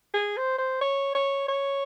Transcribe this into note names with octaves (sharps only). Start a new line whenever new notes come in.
G#4
C5
C5
C#5
C#5
C#5